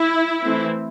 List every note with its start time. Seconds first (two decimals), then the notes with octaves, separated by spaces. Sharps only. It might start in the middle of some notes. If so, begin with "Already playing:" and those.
Already playing: E4
0.43 E3 A3 C4